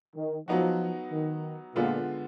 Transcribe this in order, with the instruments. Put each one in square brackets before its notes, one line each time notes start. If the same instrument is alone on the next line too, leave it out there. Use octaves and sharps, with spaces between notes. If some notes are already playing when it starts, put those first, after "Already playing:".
[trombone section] D#3
[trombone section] F3 [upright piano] F#3 B3 D#4 F#4
[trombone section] D#3
[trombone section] A#2 [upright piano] D3 G#3 B3 F4